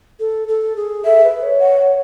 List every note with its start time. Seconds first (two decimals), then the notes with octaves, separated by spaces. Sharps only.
0.20 A4
0.48 A4
0.76 G#4
1.05 A4 E5
1.24 B4
1.43 C#5
1.61 F#5